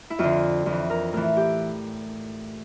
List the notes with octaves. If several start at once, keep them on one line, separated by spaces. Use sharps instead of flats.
E4
F2 D3 F4
F2 E3
A#4
A2 E3 A#4
G4